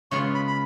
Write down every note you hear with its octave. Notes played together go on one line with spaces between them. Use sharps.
C#3 G#3 B3 F4 C#6
B5
B5